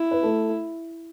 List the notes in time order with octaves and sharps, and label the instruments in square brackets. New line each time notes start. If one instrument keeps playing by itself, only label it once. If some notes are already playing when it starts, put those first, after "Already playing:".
Already playing: [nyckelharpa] E4
[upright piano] B4
A3 A4